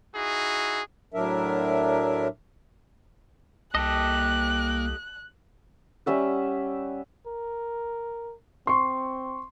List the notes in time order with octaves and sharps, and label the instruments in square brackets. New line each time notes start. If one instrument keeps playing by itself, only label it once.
[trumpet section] D#4 E4 F#4 G#4
[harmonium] A2 F#3 D4 A#4 E5
[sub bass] C2 [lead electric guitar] A#3 A5 [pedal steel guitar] G4 A4 D#5 [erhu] F#6
[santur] G3 C#4 E5 F#5
[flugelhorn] A#4
[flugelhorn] C4 [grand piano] C6 C#6